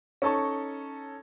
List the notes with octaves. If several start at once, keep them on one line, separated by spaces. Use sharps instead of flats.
C#4 D#4 A4 A5 C#6